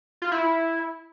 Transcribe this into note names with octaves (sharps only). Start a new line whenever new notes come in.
F4
E4